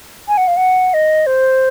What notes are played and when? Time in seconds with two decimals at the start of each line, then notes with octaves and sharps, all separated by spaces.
0.28 G#5
0.38 F#5
0.48 F5
0.57 F#5
0.94 D#5
1.27 C5